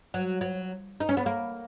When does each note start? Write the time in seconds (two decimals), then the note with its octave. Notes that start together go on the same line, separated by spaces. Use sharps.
0.14 F#3
0.41 F#3
1.00 D#4
1.09 C#4
1.17 B3
1.26 A#3